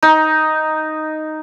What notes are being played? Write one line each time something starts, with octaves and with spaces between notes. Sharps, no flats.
D#4